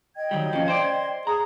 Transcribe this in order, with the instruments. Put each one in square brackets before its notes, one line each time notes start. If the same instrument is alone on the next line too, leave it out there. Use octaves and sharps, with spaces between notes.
[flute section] D#5 G5 G#6
[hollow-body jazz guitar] D#3 F#3 G3
F3 C#4
[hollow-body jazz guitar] C5 D5 [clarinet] C6
[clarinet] G#4 [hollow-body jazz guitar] A#5